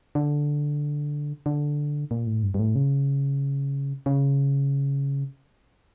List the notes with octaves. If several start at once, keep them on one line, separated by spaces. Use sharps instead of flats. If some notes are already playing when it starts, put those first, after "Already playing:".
D3
D3
A#2
A2
G2
G2
A2
C#3
C#3